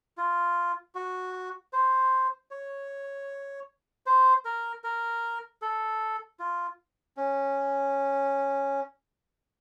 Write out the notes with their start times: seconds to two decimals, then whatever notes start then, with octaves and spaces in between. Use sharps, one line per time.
0.17 F4
0.95 F#4
1.73 C5
2.51 C#5
4.06 C5
4.45 A#4
4.84 A#4
5.62 A4
6.40 F4
7.17 C#4